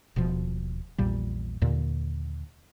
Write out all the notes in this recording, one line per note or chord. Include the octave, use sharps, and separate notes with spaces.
D#1 B2 F3
A#1 E2 A#2 G3
D#2 A#2 D3